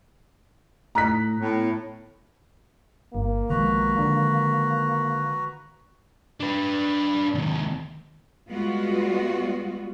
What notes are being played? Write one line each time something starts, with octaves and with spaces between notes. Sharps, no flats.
A2 A#5 F#6 B6
A2 B3
G1 A#3
B1 D#3 F3 G#3 F#4 B4 A#5
D3
D4 B4
D#2 C3
G3 G#3 B3 F4 F#4